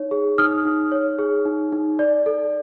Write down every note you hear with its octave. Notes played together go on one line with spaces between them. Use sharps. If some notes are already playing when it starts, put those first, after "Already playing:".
Already playing: D#4 C#5
G#4
D#4 D#6 F6
D#4
C#5
G#4
D#4
D#4
D5
A4